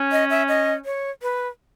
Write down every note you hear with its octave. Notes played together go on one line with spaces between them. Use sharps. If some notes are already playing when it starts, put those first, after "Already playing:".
Already playing: C#4
D#5
E5
D#5
C#5
B4